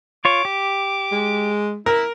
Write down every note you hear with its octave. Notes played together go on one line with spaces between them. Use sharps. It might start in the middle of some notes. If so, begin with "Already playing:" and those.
F4 C#5 D6
G4
G#3
E4 A#4